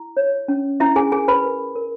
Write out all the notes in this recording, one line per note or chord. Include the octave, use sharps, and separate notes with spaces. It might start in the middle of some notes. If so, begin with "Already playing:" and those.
Already playing: E4
C#5
C#4
C#4 E4 E5
G#4 G#5
G#4 A#4 G#5
B4 B5
A#4
A#4